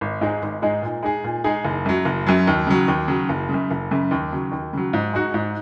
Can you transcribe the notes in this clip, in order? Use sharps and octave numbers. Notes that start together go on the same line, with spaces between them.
G#1
G#2 G#3 D#4 G#4
G#1
G#2 G#3 D#4 G#4
A#2
G#3 D#4 G#4
A#2
G#3 D#4 G#4
F#1
F#2 F#3
F#1
F#2 F#3
D#2
C#3 F#3
D#2
C#3 F#3
F#1
F#2 C#3
F#1
F#2 C#3
D#2
C#3 F#3
D#2
C#3 F#3
G#2
G#3 D#4 F#4
G#2